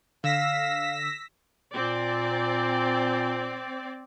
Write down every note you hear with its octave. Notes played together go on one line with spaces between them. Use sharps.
D3 F5 E6 A#6 B6
A#2 C4 D5